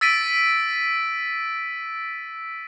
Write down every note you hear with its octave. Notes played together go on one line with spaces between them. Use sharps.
E6 A6 B6 D7 D#7